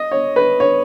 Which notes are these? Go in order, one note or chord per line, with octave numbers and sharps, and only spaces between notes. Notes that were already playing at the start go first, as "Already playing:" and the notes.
Already playing: D#5
C#5
B4
C#5